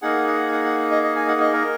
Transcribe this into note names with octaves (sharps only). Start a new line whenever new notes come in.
A#3 D#4 G#4 F#5
F#5
F#5
F#5
D#5
D#5
G#5
F#5
D#5
A#4